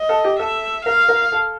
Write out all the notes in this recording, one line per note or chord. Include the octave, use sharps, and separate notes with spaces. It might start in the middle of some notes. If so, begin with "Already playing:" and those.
Already playing: D#5
A4
G4
A4 E5
A#4 F5
A#4
A4